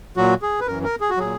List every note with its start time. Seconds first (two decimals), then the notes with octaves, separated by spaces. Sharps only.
0.17 A#2 F#3 F#4
0.42 G#4
0.60 B4
0.67 F#2 E3 A#4
0.84 A#4
1.01 G#4
1.10 F#4
1.17 A#2 F#3 G#4